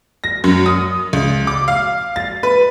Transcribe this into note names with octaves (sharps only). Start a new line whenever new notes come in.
A#6
F#2
D#6
C#2
D6
F5
A6
B4